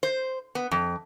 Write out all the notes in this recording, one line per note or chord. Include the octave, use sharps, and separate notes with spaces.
C5
B3
F2